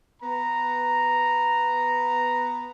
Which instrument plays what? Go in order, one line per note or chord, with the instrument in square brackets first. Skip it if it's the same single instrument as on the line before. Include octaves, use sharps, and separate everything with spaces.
[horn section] B3 A#5